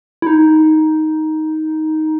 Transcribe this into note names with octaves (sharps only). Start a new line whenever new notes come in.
E4
D#4